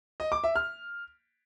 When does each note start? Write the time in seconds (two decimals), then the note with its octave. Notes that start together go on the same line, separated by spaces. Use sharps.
0.20 D#5
0.32 D6
0.44 E5
0.55 F6